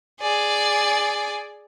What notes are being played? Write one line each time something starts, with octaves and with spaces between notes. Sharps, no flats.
G#4 D5